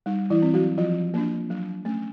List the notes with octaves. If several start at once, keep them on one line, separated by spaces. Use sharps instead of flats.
G3 D#4
E3 E4
C4
F#3 F#4
F3 F#3 F4
A#3 D4
F#3
A3 C#4